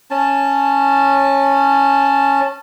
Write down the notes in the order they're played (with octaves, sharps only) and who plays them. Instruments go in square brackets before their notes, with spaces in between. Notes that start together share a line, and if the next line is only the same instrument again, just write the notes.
[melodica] C#4 A5